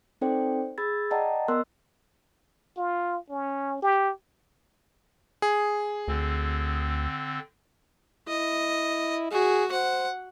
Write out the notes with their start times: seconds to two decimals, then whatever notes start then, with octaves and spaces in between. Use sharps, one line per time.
0.21 C4 D#4 A4 C5 D5 G5
0.78 G#4 B5 E6 G#6 A6
1.11 D5 D#5 F#5 G5 A5 A#5
1.48 B3 A#4 D#5 C6 E6 F#6
2.77 F4
3.29 C#4
3.82 G4
5.42 G#4
6.08 D2 D3 C4
8.28 E4 D#5
9.31 F#4 G#4
9.72 C5 F#5